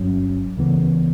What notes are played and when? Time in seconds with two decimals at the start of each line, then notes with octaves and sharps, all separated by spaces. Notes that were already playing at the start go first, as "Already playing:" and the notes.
Already playing: G1 G2 F#3 C#4
0.57 C#2 C#3 E3 B3